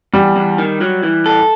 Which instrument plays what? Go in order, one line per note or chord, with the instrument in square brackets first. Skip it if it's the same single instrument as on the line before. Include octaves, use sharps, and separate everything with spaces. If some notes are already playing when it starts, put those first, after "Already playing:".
[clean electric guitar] E2 [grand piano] G3
[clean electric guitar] E2
D#3
F#3
E3
A4